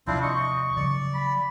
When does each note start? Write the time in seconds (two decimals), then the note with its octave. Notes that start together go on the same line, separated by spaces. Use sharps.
0.07 D#2 C3 F3 C4 D4 E4 F4
0.23 D#5 C#6
0.76 C#3 F3 F#3 D5
1.15 B5